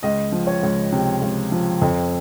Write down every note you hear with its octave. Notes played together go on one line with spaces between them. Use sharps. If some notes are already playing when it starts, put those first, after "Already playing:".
C#2 D#5
F3
C#5
C#2
C3
C#2
F3
F2